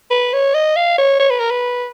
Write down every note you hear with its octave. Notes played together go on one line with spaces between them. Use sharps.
B4
C#5
D#5
F5
C#5
C#5
B4
A#4
B4